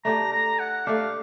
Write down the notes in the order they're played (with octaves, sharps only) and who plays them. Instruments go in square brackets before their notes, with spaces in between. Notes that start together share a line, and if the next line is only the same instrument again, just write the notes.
[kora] A3 D4 G4 [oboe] A#5
[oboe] A#5
F#5
[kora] A3 D4 G4 [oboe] F5